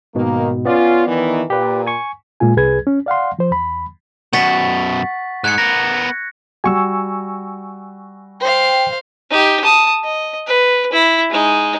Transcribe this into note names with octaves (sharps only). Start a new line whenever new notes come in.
G#2 B2 D#3 A#3
B3 C#4 F4 D5
D#3 E3
A#2 G4 B4
G#5 C#6
A#2 G#3 F4 G#5
C2 G#4 B4 G#6
C#4
D5 F5 F#5 C6
F3 C5
E2 B5
F#2 B2 F#5 C#6 A6 B6
G#2 F#6 G#6 C#7
B3 A#4 A#6
G3 F#4 G#5 C#6 E6
C5 F5 G5
D#4 G4
A5 D#6
D#5
B4
E4
G#3 D#4